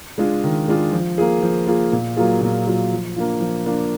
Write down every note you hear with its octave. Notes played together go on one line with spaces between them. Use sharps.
G#3 D4 F4 G#4
D#3
G#3 D4 F4 G#4
F3
A#3 F4 G#4
F3
A#3 F4 G#4
A#2
F#3 A#3 F4 G#4
A#2
F#3 A#3 F4 G#4
F3
A#3 D4 F4
F3
A#3 D4 F4